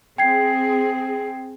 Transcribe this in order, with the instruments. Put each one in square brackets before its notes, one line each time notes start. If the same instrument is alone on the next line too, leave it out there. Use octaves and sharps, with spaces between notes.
[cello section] C4 G#4 [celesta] G5 G#6 C7